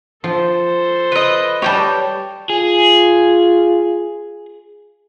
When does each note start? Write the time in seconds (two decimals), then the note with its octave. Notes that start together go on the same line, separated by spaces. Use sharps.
0.24 F3 A4 C5
1.12 B4 D#5
1.62 G3 G4 C#5 G5 A5
2.50 F4 G#4